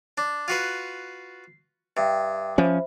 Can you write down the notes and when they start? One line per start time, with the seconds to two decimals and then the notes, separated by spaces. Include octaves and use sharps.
0.18 D4
0.48 F4 F#4 B4 C7
1.97 G2 E5 G5
2.58 F3 C#4 C5 E5 B5